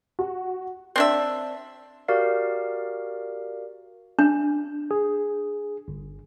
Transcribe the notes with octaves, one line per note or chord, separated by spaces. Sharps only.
F#4
C4 D4 E5
F#4 G4 A#4 D5 F5
D4
G#4
G1